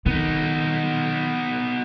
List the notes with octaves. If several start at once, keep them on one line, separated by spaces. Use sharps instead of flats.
D#3 B3 D#4